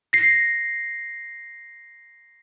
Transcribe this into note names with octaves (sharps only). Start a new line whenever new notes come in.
A#6 C7